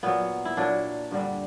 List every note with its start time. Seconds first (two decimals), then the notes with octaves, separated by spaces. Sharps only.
0.03 A#2 F#3 B3
0.45 E4
0.57 A#2 F#3 D4
1.11 G2 D3 G3